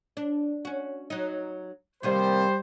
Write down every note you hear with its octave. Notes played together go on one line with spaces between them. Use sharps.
D4
C#4 F#4
F#3 D#4
C3 D#3 G3 A#3 C5